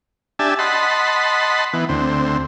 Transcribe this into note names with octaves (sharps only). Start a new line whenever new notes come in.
D4 G4 E5 G#5 A5
D#5 F#5 A5 B5 C6
E3 B3
D2 C4